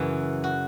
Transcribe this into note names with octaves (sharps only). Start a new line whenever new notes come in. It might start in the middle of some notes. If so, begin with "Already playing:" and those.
Already playing: F#2 C#3 E3 E4
F#4